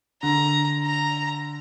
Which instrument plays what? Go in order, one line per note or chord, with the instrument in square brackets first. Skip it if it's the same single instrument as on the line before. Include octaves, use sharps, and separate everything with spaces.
[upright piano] D3 [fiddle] A#5
[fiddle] A#5